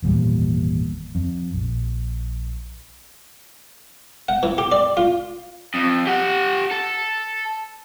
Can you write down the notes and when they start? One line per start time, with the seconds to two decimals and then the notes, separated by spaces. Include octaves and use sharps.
0.02 G#1 E2 A#2 G3
1.15 F2
1.54 A#1
4.29 F#5
4.43 E3
4.58 G4
4.72 D5
4.97 F4
5.74 F2
6.07 G4 F#5
6.71 A4